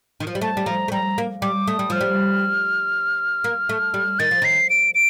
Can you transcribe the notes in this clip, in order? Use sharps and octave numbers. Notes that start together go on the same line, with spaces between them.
D#3
F3
G3
A3 A5
G3
F3 A#5
A3
G3 A#5
A#3
G3 D6
A3 D#6
G3
F3 F6
G3
A#3
A3
G3
D#3 A6
F3
D#3 C7
D7
D7